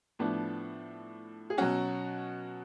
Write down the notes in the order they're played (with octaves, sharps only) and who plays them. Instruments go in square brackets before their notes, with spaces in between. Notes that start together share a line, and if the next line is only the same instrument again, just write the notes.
[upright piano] A2 F3 B3 D4
G#4
B2 F#3 C#4 F#4